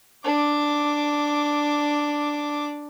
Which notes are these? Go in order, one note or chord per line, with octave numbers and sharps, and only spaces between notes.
D4 D6